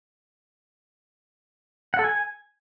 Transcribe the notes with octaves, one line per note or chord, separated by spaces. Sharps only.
F#5
A4
G#5